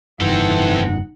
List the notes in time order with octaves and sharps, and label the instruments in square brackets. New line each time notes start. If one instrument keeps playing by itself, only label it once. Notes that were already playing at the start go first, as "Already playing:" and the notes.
[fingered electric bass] F1 G2 [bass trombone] E3 [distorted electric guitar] C4 A4 [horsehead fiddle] D#4 F#5